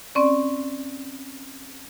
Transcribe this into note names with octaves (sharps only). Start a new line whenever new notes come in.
C4 C#4 D5